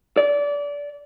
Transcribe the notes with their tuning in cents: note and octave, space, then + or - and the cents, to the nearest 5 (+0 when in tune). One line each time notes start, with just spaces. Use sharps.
D5 -25